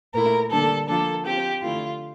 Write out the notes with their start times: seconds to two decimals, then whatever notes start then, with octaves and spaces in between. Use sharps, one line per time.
0.14 A#2 A3 E4 A#4
0.51 D3 G3 A#3 D4 A4
0.88 F3 A#3 D4 F4 A4
1.25 F3 C4 F4 G4
1.63 D3 A3 E4 F4